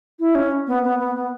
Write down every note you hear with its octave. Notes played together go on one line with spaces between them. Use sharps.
E4
C#4
B3
B3
B3
B3